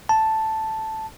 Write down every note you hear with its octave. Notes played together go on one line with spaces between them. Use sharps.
A5